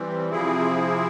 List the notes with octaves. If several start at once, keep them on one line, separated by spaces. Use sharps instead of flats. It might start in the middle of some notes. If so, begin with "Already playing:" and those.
Already playing: E3 G3 C4
C3 F3 C4 E4 G#4